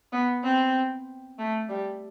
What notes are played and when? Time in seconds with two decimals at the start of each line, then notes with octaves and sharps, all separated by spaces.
0.13 B3
0.44 C4
1.39 A3
1.69 G3